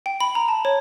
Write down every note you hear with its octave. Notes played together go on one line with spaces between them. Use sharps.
G5
B5
A#5
A5
C#5